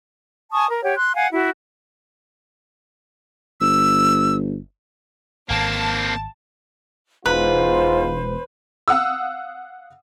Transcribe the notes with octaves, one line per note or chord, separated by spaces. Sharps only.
G#5 A5 C#6 D#6
A#4
G4 C#5 F#5
C6 F#6
F5 F#5 G#5
E4 F#4
G1 E6
G#1 A#3 C4 A5
E1 G#2 F4 B4 C5
F5 F#5 D#6 E6